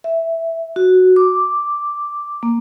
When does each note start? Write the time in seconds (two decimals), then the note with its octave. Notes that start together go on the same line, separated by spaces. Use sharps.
0.04 E5
0.76 F#4
1.16 D6
2.43 A#3